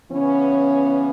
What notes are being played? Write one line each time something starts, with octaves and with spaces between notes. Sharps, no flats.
C#3 E3 B3 C#4